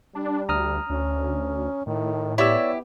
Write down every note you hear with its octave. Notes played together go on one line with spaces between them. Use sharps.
G3 D4
D2 A#5 D#6 F6
D2 C#4
A2 D#3
B3 E4 G4 C#5 D5 E6